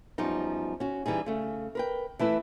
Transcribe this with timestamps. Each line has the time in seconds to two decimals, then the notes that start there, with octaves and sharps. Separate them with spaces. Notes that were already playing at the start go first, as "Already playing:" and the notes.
0.18 F#2 F3 G3 B3 D#4
0.80 C#4 F#4
1.06 E3 G3 D#4 G#4
1.26 C#3 A3
1.75 A#4 B4 G5
2.19 E3 A3 E4 B4